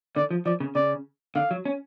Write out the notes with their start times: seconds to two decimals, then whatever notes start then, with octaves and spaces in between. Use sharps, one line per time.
0.16 D3 D5
0.31 F3
0.46 F3 D5
0.60 C#3
0.75 C#3 D5
1.36 D3 F5
1.51 F#3
1.65 C#4